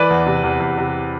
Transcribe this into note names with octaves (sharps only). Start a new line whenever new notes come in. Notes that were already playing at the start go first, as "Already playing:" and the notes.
Already playing: E3 B4 D5
E2
C3
E2
E2
C3